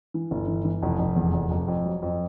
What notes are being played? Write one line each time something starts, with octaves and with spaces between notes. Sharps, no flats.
E3
G1
E3
E3
F1
F1
E2
F1
F1
F2
F#3
F2